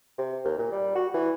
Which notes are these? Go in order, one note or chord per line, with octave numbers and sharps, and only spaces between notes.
C3
D#2
A#2
G3
F#4
E3